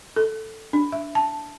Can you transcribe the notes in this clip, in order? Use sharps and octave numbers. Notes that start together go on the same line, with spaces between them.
A4
D4
E5
A5